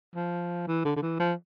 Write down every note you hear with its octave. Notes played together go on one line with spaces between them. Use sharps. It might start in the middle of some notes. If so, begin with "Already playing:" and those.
F3
E3
D3
D3
E3
F3